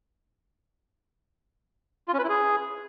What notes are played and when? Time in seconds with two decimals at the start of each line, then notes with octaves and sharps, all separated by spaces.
2.08 F4
2.13 C#4
2.19 B4
2.24 E4
2.29 G#4